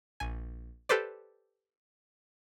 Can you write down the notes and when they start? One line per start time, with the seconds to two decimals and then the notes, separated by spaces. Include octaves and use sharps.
0.20 A#1 G#5
0.89 G4 A4 B4 C5 D5